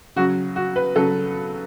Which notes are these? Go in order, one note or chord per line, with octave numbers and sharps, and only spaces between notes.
C#3 F#3 F#4
F#4
B4
C#3 F#3 A4